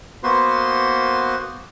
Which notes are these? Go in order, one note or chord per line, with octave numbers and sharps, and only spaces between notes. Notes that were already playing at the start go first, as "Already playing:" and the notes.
A#3 B3 F#4 B4 C5 C6